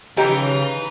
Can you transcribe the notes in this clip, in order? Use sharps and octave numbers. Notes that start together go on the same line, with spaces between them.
C#3 D#4 G4 B4 G#5 A#5 D7